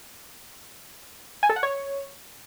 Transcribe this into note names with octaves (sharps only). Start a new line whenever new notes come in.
G#5
A4
F#5
C#5